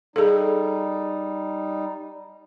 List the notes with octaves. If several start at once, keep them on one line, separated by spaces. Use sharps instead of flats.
G3 D#4 G#4 A4